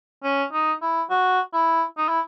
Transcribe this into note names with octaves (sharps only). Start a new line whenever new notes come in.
C#4
D#4
E4
F#4
E4
D#4
E4